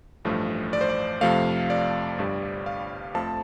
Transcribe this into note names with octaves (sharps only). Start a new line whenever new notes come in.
A1 G2 F3 A3
D5
C5
D5
F2 C3 F3 A3 F5
D5
G1 G2 G3
F5
F2 F3 A3 A5